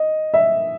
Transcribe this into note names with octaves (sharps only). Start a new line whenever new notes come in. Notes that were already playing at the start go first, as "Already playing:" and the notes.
Already playing: D#5
E5